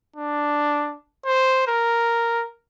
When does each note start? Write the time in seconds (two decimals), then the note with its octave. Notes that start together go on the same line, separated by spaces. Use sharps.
0.16 D4
1.26 C5
1.68 A#4